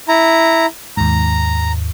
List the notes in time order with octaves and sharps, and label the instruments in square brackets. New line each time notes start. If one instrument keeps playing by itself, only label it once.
[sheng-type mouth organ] E4 A#5
[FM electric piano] D#2 G#2 [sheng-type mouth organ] A#5